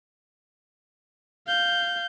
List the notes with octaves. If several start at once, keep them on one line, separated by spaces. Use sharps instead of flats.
F5 G6